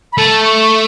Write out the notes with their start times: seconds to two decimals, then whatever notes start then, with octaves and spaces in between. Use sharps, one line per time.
0.13 B5
0.18 A3 A5
0.43 C#6
0.61 C#6